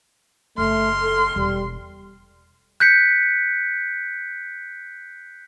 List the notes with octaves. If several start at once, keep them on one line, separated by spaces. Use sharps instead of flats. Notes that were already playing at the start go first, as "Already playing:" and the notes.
F#1 A3 C6 F6
A4
E1 G3
F#6 G6 B6 C#7